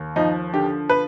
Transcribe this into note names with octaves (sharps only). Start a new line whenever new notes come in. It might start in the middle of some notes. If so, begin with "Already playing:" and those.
Already playing: D#2
F3 D#4
D3 G4
B4